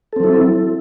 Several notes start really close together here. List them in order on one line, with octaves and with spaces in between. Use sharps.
A4 C4 F#3 E4